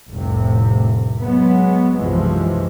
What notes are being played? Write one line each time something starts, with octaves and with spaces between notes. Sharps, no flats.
F1 C2 A2 C3
F#3 G#3 B3
B1 F#2 C3 E3 F3 G#3